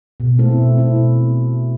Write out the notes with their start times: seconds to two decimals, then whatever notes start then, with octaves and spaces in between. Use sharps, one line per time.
0.20 B2
0.39 A3 C4 E4 A4
0.58 B2
0.77 A3 C4 E4 A4
0.96 B2